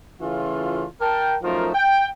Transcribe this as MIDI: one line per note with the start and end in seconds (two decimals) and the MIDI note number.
0.21 0.86 49
0.21 0.86 52
0.21 0.86 57
0.21 0.86 61
0.21 0.86 65
1.01 1.36 70
1.01 1.36 79
1.01 1.36 81
1.43 1.70 42
1.43 1.70 53
1.43 1.70 57
1.43 1.70 63
1.43 1.70 65
1.43 1.70 70
1.75 2.08 79